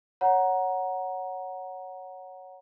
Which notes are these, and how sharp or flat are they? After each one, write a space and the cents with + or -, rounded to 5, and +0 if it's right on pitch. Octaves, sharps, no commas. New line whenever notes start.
C#5 +0 F#5 +0 A#5 +10